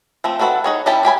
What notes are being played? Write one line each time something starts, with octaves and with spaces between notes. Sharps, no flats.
F3 A3 C4
D#3 F#4 A4 B4 F#5
D#4 G#4 C#5
G3 C#4 E4 G4 A5
D4 G4 G#5 B5